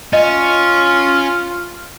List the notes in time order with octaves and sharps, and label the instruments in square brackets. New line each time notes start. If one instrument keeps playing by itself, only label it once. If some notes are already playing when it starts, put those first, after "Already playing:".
[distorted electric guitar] C#4 [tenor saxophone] F4 [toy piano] D#5